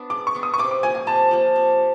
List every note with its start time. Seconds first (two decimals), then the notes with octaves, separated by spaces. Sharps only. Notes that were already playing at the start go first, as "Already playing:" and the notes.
Already playing: B3 D4
0.10 G#3 D6
0.27 C#6
0.35 B3 D4
0.43 D#6
0.54 C#6
0.58 C3 D6
0.71 D6
0.83 F3 A#3 G#5
0.95 G#5
1.07 C3 A5
1.31 F3 A#3
1.56 C3